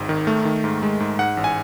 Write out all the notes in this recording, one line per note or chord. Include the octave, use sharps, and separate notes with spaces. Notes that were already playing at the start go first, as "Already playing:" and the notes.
Already playing: G#1 G#2
D#3
A3
D#3
G#2
G#3
G#2
G#2 F#5
A1
G#5